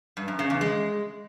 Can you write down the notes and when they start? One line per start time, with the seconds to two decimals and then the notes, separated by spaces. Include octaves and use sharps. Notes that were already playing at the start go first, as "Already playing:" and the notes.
0.17 G2
0.28 F#2
0.39 C#3
0.50 E2
0.61 G#3